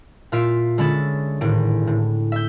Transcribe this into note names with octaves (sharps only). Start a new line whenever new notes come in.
A#2 F4 E5 D7
D3 G#3 C#4 B5 A6 E7
G#1 A2 D7
A2
E5 G6